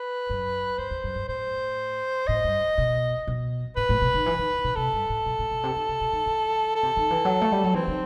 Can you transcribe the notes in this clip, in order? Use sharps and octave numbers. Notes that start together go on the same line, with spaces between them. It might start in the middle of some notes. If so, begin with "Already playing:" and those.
Already playing: B4
F#2
F#2 C5
E2
F#2
G2
A2 C5
A2 D#5
G2
B2
B2
A2 B4
A2
B2
D#3
E3
D#3
B2
C3 A4
G2
A2
B2
A2
B2
C3
D#3
C3
B2
D#3
E3
A4
C3
D#3
E3
F#3
A3
G3
F#3
E3 C4
D#3